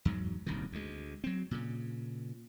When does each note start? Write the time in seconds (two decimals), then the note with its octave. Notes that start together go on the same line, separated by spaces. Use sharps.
0.05 E2 G#2 F#3
0.46 D#1 C2 F#2 D#3
0.72 D2 G#3
1.24 F#3 C4
1.51 A#2 C#3